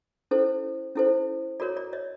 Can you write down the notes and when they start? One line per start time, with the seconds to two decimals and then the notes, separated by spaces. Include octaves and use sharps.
0.31 C#4 E4 A4 C5
0.96 C#4 E4 A4 C5
1.60 F#4 A#4 C#5 D5
1.77 D5
1.93 C#5 D#5